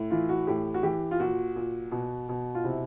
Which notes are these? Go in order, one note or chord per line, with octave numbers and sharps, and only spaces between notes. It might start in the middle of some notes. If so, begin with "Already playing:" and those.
Already playing: A2
E3 F4
F#4
A2 G4
F#4
E3 G4
F4
A#2 F#4
A#2
B2
B2
F4
C3 E4